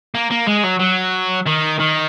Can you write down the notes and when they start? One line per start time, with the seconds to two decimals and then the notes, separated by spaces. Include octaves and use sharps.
0.15 A#3
0.31 A#3
0.47 G#3
0.64 F#3
0.80 F#3
1.46 D#3
1.79 D#3